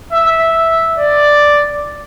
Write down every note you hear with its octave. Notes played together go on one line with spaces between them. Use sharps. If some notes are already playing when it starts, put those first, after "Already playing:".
E5
D5